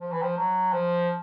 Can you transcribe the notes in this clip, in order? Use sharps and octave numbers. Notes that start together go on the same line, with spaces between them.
F3
E3
F3
F#3
F3